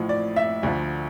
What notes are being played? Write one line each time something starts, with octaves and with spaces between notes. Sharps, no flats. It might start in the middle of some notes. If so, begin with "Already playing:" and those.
Already playing: A1 A2 F3
D5
E5
D2 D3 F3